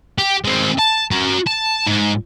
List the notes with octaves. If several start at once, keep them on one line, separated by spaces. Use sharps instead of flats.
G4
G#3 C4
A5
F#4 A#4
A5
G#2